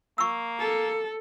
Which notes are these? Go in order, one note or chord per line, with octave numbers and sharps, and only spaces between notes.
A#3 C#6 E6
A4